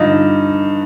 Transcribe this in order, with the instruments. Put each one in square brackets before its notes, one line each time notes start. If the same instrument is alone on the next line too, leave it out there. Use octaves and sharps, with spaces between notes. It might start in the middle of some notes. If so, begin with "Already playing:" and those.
Already playing: [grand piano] G2 D3 F4 [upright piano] D#4